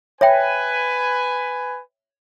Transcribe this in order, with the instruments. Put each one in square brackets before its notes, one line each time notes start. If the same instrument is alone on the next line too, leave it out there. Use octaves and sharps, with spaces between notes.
[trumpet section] B4 G#5 [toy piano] C#5 E5 G5